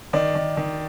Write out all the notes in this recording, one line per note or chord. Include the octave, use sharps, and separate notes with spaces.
D#3 D5
D#3
D#3